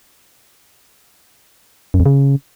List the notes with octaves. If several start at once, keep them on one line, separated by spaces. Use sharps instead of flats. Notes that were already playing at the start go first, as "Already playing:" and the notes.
F#2
F2
C#3